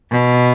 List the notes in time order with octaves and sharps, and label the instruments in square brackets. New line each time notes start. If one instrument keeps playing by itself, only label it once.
[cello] B2